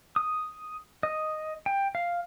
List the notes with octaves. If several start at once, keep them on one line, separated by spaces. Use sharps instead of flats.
D#6
D#5
G5
F5